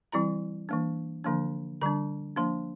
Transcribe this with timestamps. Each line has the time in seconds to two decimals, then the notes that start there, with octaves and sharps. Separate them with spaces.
0.12 E3 G3 C4 E4 A#5
0.69 E3 A#3 D4
1.24 D3 F3 A#3 D4
1.81 D3 G3 D4 A#5
2.36 F3 A#3 D4 C6